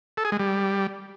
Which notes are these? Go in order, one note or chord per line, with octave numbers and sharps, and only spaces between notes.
A4
G#4
G#3
G3